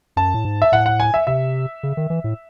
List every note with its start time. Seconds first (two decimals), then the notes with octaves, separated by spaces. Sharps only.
0.16 F#2 A5
0.34 A2
0.45 G#2
0.62 E5
0.72 A2 F#5
0.86 F#5
1.00 G#5
1.14 E5
1.27 C3 E5
1.83 C#3
1.97 D#3
2.10 E3
2.24 A2